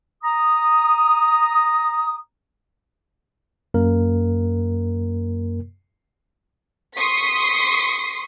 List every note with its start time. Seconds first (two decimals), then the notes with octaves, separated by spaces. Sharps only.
0.23 A#5 D#6
3.74 F#2 A#3 A#4
6.97 C6 C#6 D#6 B6 C7